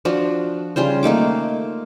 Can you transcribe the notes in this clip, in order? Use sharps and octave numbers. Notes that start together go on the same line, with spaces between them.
F3 D4 F#4
C#3 G3 F4 C5
A3 A#3 D#4 D6